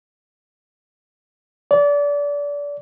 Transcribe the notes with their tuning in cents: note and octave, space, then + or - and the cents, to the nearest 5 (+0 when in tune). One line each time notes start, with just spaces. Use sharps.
D5 -30